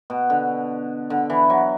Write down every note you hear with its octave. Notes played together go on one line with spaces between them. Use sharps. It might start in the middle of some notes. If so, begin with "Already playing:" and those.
B2
D3
D3
E3
F#3